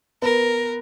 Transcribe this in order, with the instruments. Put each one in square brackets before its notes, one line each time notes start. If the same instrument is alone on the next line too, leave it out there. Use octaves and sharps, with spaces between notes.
[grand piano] B3 B4 [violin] A#4